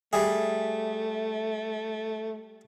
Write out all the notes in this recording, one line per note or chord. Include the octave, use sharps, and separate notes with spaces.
G3 A3 G#4 E5